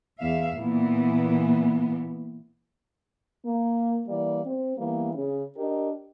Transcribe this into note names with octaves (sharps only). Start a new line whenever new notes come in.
E2 E5 F5
A#2 E3 B3
A#3
E3 G3 A#3 D5
C4
E3 G3 A#3 B3
C#3
D4 G4 A#4 D#5